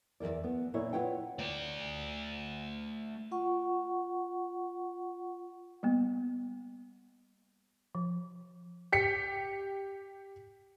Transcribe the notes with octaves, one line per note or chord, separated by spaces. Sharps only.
E2 C3 A#4 D5
B3
A#2 E4 A#4 C#5
F4 B4 C#5 F#5 G5
A3 D5
F4 F#5 C#6
G3 A#3 B3
F3
G4 B6 C#7